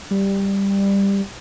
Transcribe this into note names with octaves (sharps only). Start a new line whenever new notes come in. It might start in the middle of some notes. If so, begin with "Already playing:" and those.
G3